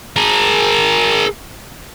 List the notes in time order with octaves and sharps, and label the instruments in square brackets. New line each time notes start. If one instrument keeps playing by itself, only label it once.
[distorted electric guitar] G#4 A#4